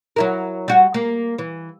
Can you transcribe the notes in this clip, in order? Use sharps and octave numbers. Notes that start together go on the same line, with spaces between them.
F#3 E4 A#4
G3 F#4
A#3
E3